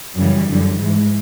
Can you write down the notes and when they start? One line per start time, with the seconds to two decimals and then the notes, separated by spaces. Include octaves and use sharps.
0.16 F#2 C#3 E3 G3
0.49 F#2 D3
0.79 G#2 E3 G#3